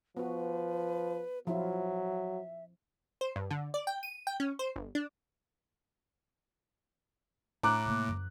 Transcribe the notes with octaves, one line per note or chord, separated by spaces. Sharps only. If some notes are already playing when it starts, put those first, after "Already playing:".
F3 B3 F#4 B4
F3 F#3 E4 F4 E5
C5
G2
D3
D5
G5
D#7
G5
C#4
C5
G1
D4
A2 E4 A#5 D6 F#6
C3 A#3
F#2 F3